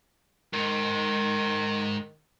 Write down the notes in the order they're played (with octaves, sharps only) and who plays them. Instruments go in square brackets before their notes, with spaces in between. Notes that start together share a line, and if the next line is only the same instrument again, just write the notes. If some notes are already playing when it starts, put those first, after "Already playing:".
[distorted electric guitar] G#2 [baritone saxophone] D#3